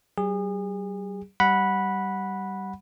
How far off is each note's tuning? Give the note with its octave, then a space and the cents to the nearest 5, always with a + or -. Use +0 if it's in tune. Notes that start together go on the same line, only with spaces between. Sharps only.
G3 -45 G#4 -35
G3 -15 F#5 -5 B5 -10